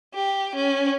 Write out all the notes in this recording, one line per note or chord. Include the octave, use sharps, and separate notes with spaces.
G4
C#4